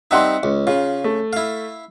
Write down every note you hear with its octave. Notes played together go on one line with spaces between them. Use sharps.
G3 C4 D#4 E5 F#5 C6
C#2
C#3 F4
A3
E4 F5